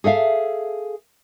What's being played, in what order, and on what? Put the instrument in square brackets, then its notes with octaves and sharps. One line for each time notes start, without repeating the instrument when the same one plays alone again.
[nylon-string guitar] G#4 A4 E5 F5